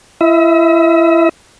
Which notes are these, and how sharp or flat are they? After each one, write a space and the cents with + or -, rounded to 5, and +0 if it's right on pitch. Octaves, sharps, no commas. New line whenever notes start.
E4 +30 E5 -45